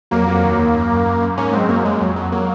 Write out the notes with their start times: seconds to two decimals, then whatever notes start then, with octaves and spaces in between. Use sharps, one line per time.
0.11 F2 F#3 A#3
0.28 F#3
0.43 D#2
0.59 D#2
0.74 F#2
0.90 F#2
1.06 F#2
1.22 F#2
1.37 G#2 A#3 C#4
1.53 F#3 G#3 C4
1.69 F#2 F#3 A#3
1.85 F#2 G#3
2.00 F2 F#3
2.16 F#3
2.32 F#3 A#3